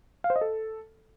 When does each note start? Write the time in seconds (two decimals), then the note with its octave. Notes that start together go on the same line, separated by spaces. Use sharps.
0.24 F5
0.30 C5
0.36 D#5
0.41 A4